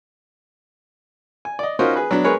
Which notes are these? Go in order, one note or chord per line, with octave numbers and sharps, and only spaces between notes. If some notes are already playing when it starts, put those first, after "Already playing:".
G#5
D5 D#5
C#4 D#4 F4 F#4 A#4 C5
G#4 B4
F#3 B3 D4
G#3 G#4 A#4 B4 C#5